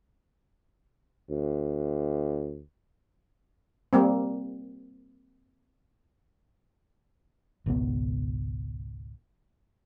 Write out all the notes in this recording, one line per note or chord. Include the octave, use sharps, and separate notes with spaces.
D2
G3 A#3 C4
G#1 C#2 B2 B3